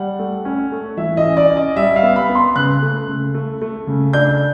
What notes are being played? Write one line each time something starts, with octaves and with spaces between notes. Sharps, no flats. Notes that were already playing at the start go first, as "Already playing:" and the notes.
Already playing: G3 F#5
A3
C#4
A3
E3 E5
D#5
C#4
D5
C#4
D#5
G3 E5
F5
B3
B5
B3
C6
C#3 F#6
A3
C#3
A3
A3
C#3
D4 G6